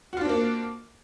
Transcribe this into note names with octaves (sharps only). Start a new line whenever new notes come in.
A#3 C4 D4 F4 F#4